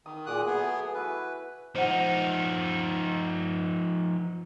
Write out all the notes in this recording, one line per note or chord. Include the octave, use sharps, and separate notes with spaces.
D#3 D#6
A#2 F#3 G#4 D6 D#6 F#6
A3 B3 G#4 F#5
E4 F#4 B4 G#5
F3 D#4 C5 F#5